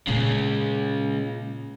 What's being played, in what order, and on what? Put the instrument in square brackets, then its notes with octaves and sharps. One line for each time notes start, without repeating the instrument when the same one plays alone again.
[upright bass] A#2 A#3 [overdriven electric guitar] C#3 G#3